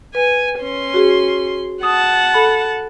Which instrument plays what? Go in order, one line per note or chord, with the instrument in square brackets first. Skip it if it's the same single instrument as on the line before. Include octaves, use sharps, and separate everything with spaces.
[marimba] B4 [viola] G#5
[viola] C#4 C6
[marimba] F#4 G#4
[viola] F#5 A5 [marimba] D#6
[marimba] A4 B5